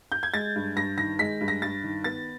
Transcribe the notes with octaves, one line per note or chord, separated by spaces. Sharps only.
G6
G#6
G#3 A6
G2
G2 A#6
D#3 A#6
G#3 B6
G2
A#6
G2 A6
D#3
B3 A6